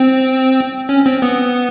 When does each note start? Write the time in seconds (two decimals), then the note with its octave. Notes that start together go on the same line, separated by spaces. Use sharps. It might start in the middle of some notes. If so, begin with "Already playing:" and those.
Already playing: C4
0.89 C#4
1.06 C4
1.22 B3